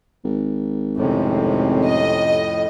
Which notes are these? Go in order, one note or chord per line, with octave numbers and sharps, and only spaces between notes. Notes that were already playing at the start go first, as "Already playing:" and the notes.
G#1
F2 A2 C3 C#4
D#5